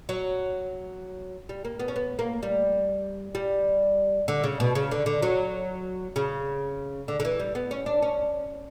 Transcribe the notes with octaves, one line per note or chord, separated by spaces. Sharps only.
F#3
G3
A#3
B3
C#4
B3
A#3
G3
G3
D3
C#3
B2
C#3
D3
D3
F#3
C#3
D3
D3
E3
G3
B3
C#4
D4
C#4